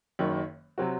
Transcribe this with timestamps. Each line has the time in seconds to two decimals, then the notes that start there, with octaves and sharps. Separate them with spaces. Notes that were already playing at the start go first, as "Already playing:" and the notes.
0.19 F#1 F#2 D#3
0.78 C3 F#3 C4 F#4